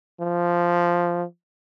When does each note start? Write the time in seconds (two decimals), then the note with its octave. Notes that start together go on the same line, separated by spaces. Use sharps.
0.20 F3